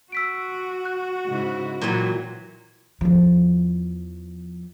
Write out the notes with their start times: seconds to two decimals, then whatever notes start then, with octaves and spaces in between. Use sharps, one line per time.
0.12 F#4 E6 B6 D7
0.85 F#6
1.26 G#2 C#3 E4
1.81 A#2 E3 F#3
3.01 E2 F3